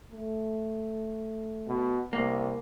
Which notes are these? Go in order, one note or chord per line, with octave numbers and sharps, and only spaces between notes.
A3
B2
C2 A#3